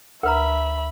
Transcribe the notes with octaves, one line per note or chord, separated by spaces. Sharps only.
D2 A#4 B4 E5 A#5 B5